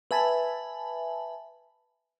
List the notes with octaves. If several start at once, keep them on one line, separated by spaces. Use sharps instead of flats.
B4 E5 G#5 A5 B5